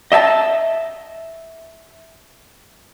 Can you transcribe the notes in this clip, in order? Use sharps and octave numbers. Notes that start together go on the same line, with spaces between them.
D#5 E5 G#5 A5